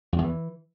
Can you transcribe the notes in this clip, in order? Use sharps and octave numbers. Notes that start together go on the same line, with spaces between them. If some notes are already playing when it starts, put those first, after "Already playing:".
F2
E2
E3